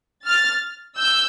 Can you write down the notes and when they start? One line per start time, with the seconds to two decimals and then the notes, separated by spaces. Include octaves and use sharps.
0.26 F6 A6
0.96 E6 G6